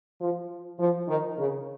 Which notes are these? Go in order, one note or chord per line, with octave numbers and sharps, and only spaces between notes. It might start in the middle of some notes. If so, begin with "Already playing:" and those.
F3
F3
D#3
C#3